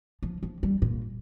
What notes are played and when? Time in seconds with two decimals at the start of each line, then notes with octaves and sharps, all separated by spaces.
0.22 F3
0.43 F3
0.63 G3
0.82 A#2